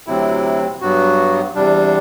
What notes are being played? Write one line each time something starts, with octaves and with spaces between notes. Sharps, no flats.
D2 C3 F#3 C4 E4
G2 F#3 B3 F#4
E2 C3 G3 D4